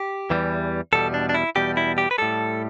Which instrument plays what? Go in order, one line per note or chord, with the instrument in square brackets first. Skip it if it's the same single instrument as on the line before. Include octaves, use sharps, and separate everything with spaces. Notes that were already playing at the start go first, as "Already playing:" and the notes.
Already playing: [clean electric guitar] G4
E2 E3 G3
E2 B2 G3 A4
D4
D4
E4
E2 B2 G3 G4
E4
G4
B4
A2 G3 A4